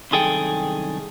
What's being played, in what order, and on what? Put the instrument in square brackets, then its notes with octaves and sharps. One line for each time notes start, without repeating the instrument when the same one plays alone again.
[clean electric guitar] C2 F#2 D#3 G#4 A4 G5